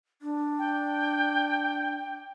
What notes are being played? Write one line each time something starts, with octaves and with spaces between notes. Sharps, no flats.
D4
G5